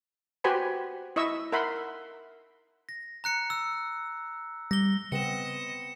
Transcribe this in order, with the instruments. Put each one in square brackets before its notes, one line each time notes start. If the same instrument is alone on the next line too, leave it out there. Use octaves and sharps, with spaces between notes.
[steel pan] F#4 G4 B4 C5 G#5 B5
E4 D#5 E5 C#6 E6
A#4 E5 F#5 B5 C6
[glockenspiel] A#6
A#5 F#6 C#7
E6
[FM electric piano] G3 [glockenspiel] A#6 G7
[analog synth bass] C#3 [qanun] B3 C4 F#5 [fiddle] D#5 [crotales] C#7 E7